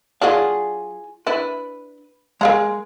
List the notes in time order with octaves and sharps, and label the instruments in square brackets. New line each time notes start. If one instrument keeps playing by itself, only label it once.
[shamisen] F#3 D4 [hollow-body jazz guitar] F4 G#4 F5
[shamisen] D4 E4 [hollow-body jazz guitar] B4
[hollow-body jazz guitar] G#3 [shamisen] A#4 F5 A#5